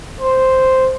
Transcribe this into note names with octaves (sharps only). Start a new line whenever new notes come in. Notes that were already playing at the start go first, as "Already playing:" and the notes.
C5